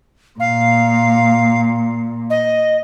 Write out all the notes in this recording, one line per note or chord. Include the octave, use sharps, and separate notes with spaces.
A#2 F5
D#5